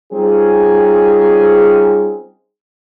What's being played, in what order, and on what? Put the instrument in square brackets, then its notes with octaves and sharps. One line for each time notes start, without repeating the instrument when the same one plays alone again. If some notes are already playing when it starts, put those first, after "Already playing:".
[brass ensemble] G3 C4 C#4 D#4 F4 G#4